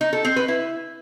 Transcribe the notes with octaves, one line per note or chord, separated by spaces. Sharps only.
D#4
A4
C4
B4
E4